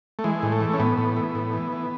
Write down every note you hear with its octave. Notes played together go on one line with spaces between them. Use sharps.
A3
E3 G#3
A2
A3
E3
C#4
A2 B3
A2
E3
A2
E3
E3